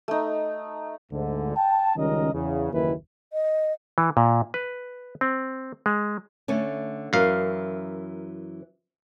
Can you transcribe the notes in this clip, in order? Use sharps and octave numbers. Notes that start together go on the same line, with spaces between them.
A3 D#4
D2 G#2 D3
G5 A5
C#2 D#3 G3 C#4 A#4 D#5
E2 C#3
F#1 D#2 D#3 E3 E4 B4
D#5
E3
A#2
B4
C4
G#3
D3 A3 C#4
F#2 E3 A#4 F5